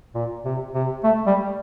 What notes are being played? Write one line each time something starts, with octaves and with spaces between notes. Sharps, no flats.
A#2
C3
C3
A3
G3